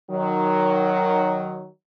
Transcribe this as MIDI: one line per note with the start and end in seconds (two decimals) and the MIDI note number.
0.10 1.67 51
0.10 1.67 54